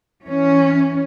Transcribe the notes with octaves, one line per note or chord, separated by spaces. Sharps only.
E3 C#4